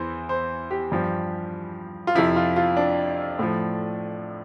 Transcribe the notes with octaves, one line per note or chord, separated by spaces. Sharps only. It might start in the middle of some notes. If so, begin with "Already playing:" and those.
Already playing: E2 E3 C5
C5
G4
G2 F3
F4
F2 C3 F3 E4
F4
F4
D4
A2 F3